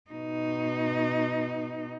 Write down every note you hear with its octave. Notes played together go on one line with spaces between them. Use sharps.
B2 D#4